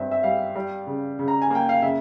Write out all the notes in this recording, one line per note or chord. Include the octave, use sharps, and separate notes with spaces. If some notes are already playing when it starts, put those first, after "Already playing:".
Already playing: G2 C4 E5
E5
G3 F5
G3
C#3
C#3
A#5
G#5
A#3 G5
F5
C#3 E5